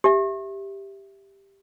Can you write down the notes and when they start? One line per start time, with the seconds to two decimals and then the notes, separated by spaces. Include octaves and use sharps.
0.04 G4 E5